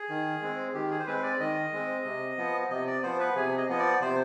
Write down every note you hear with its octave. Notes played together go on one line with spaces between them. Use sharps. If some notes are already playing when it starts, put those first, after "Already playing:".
Already playing: G#4
D#3
G#3 C4
D#3 G4
G#4
C5
G#3 C4 B4
D5
D#3 D#5
G#3 C4
C3
F3 B3
C3 D#5
D5
F3 B3 C5
B4
C3 G#4
D#5
F3 B3 D#5
D5
C3 C5